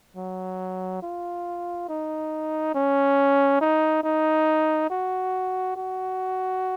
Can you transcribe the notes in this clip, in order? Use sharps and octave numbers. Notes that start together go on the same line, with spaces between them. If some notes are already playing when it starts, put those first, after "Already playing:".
F#3
F4
D#4
C#4
D#4
D#4
F#4
F#4